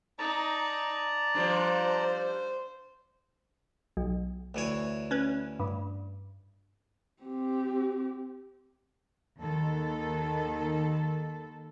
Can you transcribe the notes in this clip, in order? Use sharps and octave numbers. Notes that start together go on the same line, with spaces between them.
D#4 D5 A5 A#5
F3 G3 D4 C5
B1
D2 E3 C#5
C#4 B4
G2
C4 G4
D#2 D#3 A4